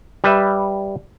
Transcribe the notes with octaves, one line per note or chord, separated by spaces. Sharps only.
G3 B4 E5